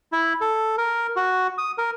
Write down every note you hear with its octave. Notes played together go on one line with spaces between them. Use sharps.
E4
A4
A#4
F#4
D#6
A#4